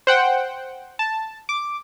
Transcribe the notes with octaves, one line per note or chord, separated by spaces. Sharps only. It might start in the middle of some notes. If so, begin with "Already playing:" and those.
C5 F#5 G5
A5
D6